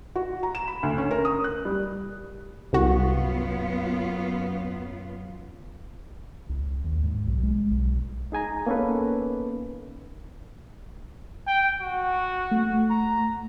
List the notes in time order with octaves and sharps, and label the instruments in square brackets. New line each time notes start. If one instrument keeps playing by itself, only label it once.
[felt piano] F#4
A#5
E7
B5
D2
C#4
A#4
D#6
F#6
G3
[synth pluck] C2 F#4 [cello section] F#2 B3 F4
[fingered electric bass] C#2
D#2
G#2
B1
G#3
B1
[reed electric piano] D#4 G#4 G#5 A#5
A#3 B3 C#4 D#4 A4 B4
[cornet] G5
F#4
[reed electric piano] A3
[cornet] A#5